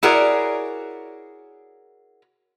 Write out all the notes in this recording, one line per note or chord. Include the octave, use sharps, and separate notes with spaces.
E4 F#4 G#4 A#4 C#5 D5